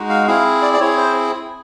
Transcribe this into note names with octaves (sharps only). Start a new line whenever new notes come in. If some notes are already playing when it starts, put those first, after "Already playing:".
Already playing: G#3 D#4 F#4
F5
C4 E4 G#4 F5
D5
D5
C4 E4 G#4 C#5
C5